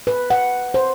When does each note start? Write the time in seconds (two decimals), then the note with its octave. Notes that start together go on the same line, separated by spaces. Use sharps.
0.07 B4
0.30 F#5
0.74 C5